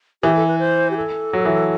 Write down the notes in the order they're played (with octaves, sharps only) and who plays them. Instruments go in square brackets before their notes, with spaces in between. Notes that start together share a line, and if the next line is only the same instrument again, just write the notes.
[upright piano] E3 [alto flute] G4
[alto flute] A4
B4
C5
G4
A4
[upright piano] F#3
E3